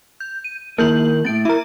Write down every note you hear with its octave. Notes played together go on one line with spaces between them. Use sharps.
G6
D#7
D#3 A#3 E4 A#4 G6 F#7
A2 B3 A6 D7
E4 A#4 E5 A#5